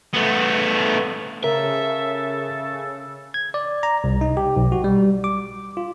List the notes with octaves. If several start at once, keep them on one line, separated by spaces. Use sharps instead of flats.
A3 B3
C#3 A4 A#4 E5
G#6
D5
A#5
C2
D#4
G4
B1
F#4
G3
D6
F4